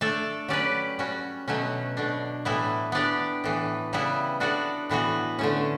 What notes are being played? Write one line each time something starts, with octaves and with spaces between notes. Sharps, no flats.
A3 D4 A4 D5
F#3 C#4 G4 B4 D5
G3 C#4 F#4
B2 F#3 A3 C#4
B2 A3 D4
A2 E3 B3 E4
B3 D4 G4 D5
A2 E3 B3
C#3 G3 B3 E4
B3 D4 F#4 A4 D5
A2 E3 B3 F#4
D3 A3 C#4